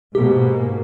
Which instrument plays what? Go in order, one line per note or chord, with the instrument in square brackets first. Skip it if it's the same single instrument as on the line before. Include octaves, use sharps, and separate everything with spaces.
[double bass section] G#2 B2 A#3 [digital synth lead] G4